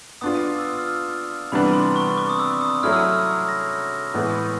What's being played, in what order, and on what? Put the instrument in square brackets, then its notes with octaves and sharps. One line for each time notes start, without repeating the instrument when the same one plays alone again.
[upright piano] B3 D4 F4 [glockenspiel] D#6
[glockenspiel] D6
E6
D#6
F6
E6
[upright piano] C3 E3 G3 B3 D4 [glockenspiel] B5
[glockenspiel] C6
C#6
D6
D#6
E6
D#6
[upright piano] F#3 A3 C#4 E4 G#4 [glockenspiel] F6
[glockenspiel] E6
F6
A#6
[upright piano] A2 E3 G#3 B3